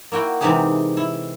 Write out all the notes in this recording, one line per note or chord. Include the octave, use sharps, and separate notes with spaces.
A#3 E4 F#4 G5
C3 E3 G#3 D#4 G4 G#4
E4